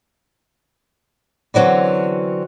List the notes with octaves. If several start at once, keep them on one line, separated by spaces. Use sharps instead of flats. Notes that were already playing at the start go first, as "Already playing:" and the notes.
D3 E3 F#3 C4 C#4